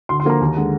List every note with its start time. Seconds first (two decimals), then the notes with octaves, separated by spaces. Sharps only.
0.09 D2 C6
0.20 C6
0.25 D3 F3 A#3 A#5
0.41 D#2
0.57 D3 G#3